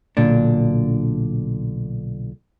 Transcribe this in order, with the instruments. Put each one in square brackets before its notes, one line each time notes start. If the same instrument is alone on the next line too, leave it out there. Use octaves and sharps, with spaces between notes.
[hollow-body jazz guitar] B1 A#2 D3 D4